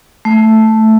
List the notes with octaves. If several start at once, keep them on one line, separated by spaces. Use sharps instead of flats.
A3